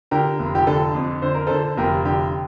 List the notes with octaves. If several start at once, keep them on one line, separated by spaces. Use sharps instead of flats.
D3 G4 A#4
F1
G4
D3 A4
F2
D3 C5
A#4
D3 A4 C5
F1 G4 A#4
D3 G4